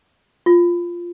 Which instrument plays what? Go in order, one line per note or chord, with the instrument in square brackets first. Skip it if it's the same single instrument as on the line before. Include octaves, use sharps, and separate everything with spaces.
[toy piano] F4